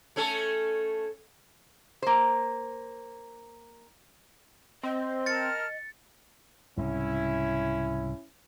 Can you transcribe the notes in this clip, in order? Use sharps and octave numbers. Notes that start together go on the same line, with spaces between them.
A3 C#4 A4
A#3 C5
C4 D#5
A#4 A5 F6 A6 C#7
C2 G#2 C#3 C#4 E4